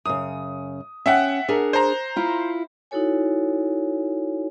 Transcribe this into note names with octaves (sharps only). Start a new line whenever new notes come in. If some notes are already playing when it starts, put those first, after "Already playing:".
F#2 C#3 D#6
C#4 E5 F#5 G5 F#6
D4 G#4 A#4
C5 A#5
E4 F4
D#4 E4 F#4 A4 C#5 G#5